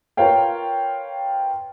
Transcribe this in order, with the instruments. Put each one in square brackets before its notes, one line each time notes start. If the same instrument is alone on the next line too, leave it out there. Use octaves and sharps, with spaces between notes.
[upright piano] F4 A#4 B4 C#5 F5 G5